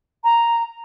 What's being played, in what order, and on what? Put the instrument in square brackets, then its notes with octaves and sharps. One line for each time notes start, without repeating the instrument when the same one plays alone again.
[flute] A#5